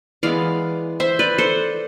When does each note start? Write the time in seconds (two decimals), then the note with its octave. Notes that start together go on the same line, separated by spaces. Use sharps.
0.23 E3 G#3 B3 D5 F5
1.00 C5 E5
1.19 B4 D5
1.38 A4 C5